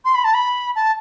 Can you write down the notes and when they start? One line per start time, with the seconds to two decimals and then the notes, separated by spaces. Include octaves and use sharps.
0.05 C6
0.15 B5
0.24 A5
0.34 B5
0.76 A5